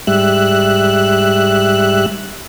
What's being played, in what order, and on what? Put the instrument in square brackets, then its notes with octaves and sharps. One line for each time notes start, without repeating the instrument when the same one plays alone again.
[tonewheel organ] G#2 G3 E5 F#6